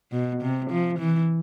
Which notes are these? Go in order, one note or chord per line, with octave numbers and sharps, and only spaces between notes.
B2
C3
F3
E3